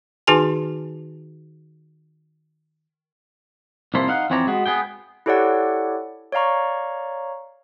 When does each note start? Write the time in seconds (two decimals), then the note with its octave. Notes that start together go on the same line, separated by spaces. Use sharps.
0.27 D#3 D#4 F#4 G#4 G#5 A5
3.94 C2 F2 A#3 E4 A4 C5
4.08 D#4 F5 F#5
4.30 F2 E3 C4 C#5 D5 A#5
4.47 G#3 B3 F#4
4.66 B3 G#4 G5
5.26 E4 G4 A4 C#5 D5 F#5
6.32 C#5 D5 F5 A#5 C#6